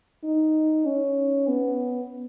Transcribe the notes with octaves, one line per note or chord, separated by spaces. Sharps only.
D#4
C#4
B3